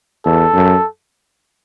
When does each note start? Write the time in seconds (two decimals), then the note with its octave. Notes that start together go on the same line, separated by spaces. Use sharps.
0.25 E2 A4
0.54 F#2